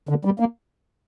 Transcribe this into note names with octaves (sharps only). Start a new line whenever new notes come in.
D3
G3
A#3